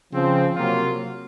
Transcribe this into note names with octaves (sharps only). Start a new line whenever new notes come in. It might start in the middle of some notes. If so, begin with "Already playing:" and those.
C#3 F3 C4
C3 F#3 A#3 F4